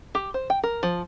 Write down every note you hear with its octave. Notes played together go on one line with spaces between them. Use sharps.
G4
C5
G5
A#4
F3